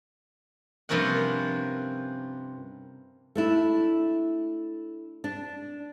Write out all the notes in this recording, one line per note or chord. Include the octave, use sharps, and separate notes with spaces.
G2 C3 F3 A#3 C#4 F#5
A3 D4 E4
D4